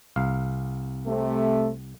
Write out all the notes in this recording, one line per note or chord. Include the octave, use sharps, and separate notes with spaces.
C2 F5
C3 A3